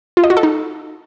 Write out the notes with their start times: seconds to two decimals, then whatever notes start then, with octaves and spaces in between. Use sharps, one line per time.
0.17 F4
0.24 D#5
0.30 F#4
0.37 A4
0.43 D#4